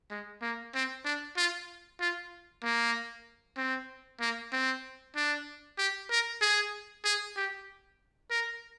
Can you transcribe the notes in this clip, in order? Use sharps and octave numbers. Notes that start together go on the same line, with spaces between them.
G#3
A#3
C4
D4
F4
F4
A#3
C4
A#3
C4
D4
G4
A#4
G#4
G#4
G4
A#4